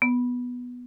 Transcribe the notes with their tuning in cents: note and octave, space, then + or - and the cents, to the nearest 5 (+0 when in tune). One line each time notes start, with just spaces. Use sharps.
B3 -5